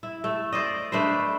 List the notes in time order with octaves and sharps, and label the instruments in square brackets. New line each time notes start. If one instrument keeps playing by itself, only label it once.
[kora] E4
A3
C5 D5 D#5
A3 D4 B4 C5